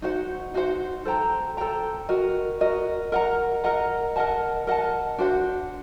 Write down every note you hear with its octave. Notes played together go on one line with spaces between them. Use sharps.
D#4 F#4 C5 F#5
D#4 F#4 C5 F#5
A4 C5 G5 A#5
A4 C5 G5 A#5
F#4 A#4 D#5
F#4 A#4 D#5
A#4 D#5 F#5 A#5
A#4 D#5 F#5 A#5
A#4 D#5 F#5 A5
A#4 D#5 F#5 A5
D4 F#4 C5 F#5